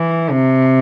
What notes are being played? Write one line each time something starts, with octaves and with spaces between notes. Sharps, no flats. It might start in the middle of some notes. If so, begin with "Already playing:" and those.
Already playing: E3
C3